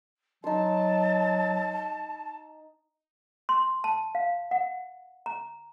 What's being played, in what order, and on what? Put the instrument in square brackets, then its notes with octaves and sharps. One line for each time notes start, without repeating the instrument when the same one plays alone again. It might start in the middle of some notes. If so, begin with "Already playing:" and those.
[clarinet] F#3 [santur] D#4 C6 [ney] A5
[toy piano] C6
A5
F5
F#5
A#5